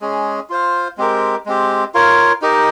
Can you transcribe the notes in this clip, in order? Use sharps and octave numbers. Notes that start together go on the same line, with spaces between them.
G#3 C#4 G#4
F4 C5 F5
G#3 C4 G4 A#4
G#3 C4 G4
F4 A#4 C#5 F5
D#4 G4 A#4 D#5